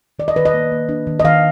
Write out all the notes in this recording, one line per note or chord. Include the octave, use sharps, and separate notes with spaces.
D#3 D5
D#5
D#3 B4
D#5
A#3
A#3
D4
D#3
D#5
D#3 F5